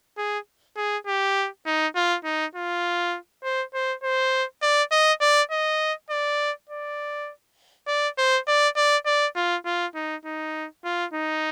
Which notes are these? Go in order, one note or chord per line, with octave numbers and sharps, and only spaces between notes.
G#4
G#4
G4
D#4
F4
D#4
F4
C5
C5
C5
D5
D#5
D5
D#5
D5
D5
D5
C5
D5
D5
D5
F4
F4
D#4
D#4
F4
D#4